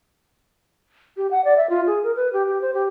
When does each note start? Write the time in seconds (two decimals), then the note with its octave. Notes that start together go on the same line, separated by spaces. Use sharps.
1.17 G4
1.31 F#5
1.45 D5
1.57 E5
1.70 F4
1.87 G#4
2.04 A#4
2.16 B4
2.33 G4
2.47 G4
2.61 C5
2.74 G4